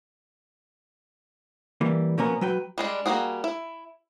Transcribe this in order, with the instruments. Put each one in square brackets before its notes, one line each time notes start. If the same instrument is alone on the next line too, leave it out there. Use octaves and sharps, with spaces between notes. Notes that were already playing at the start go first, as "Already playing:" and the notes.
[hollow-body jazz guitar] E3 G3 A#3
B2 F3 A#3 B3 C#4 A#4
F#3 B4 G5
[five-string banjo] G3 G#3 D4
G3 A#3 F4 F#4 G#4
E4